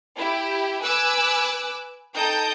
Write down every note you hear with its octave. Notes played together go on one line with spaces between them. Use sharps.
E4 G4
B4 G#5 D6 E6 F#6
D#4 A4 G5 A5 D#6 G6